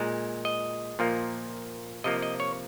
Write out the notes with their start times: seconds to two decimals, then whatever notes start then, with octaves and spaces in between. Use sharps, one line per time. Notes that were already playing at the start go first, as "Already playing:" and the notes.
Already playing: A#2 G#3
0.45 D#5
0.99 A#2 F3 A#3
2.04 C3 F3 A#3 D#5
2.22 D#5
2.40 C#5